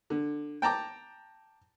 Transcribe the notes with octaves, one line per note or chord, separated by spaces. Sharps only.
D3
G5 A5 A#5 D6